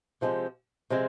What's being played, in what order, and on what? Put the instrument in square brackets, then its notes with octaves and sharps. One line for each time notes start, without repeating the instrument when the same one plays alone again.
[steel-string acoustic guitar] C3 F3 G#3 C4 G4
C3 F3 G#3 C4